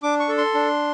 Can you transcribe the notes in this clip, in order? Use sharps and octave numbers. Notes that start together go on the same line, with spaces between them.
D4 D6
C#6
A4
C6
D4